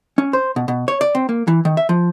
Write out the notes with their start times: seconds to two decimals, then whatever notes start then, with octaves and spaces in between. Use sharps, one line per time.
0.18 C#4
0.33 C5
0.56 B2
0.68 B2
0.88 C#5
1.01 D5
1.15 C4
1.29 A#3
1.48 E3
1.65 D#3
1.77 E5
1.89 F3